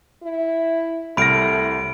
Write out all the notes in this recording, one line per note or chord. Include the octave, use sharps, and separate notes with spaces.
E4
C2 A2 B5 F6 A#6 D7